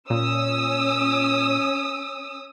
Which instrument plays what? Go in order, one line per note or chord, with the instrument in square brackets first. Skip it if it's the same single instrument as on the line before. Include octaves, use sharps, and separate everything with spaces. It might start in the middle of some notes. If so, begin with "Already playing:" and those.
[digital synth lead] A#2 [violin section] C#4 D#6 E6